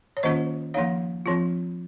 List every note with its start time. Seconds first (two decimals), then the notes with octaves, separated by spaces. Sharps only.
0.17 C#5
0.23 D#3 A#3 C#4 F4 C5 D#5
0.74 F3 A#3 D#4 C#5 F5
1.26 F3 C4 F4